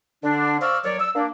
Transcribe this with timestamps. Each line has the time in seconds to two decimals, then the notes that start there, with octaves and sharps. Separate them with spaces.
0.24 D3 D4
0.61 C5 D5 F5 C#6 E6 F6
0.85 D#2 F#3 C#5 D5
1.00 E6
1.15 A#3 D4